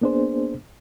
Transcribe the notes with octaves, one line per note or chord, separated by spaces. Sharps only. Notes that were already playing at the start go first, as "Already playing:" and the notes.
A#3 B3 D4 G#4 C5